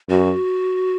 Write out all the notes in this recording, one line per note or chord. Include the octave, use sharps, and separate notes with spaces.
F#2 F#4